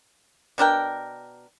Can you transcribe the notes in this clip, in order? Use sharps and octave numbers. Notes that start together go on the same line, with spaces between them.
B2 D4 A#4 G5